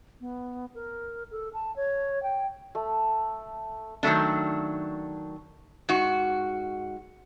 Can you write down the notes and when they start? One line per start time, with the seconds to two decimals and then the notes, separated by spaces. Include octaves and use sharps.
0.21 B3
0.75 A#4
1.31 A4
1.54 A5
1.76 C#5
2.23 G5
2.75 A3
4.03 D#3 F#3 A3 D4
5.89 G#2 F#4